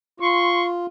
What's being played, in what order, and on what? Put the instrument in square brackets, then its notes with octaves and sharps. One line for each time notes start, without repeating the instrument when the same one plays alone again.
[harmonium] F4 [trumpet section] C6 C#6